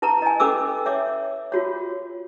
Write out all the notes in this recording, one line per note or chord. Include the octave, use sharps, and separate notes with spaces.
E4 B4 A5 A#5
D#5 G#5
C#4 A4 B4 D6 E6
C#5 E5 D6
F4 F#4 C#5